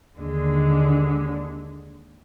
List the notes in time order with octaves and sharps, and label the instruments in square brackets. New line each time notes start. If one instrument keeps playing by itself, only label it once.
[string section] D#2 D3 G#3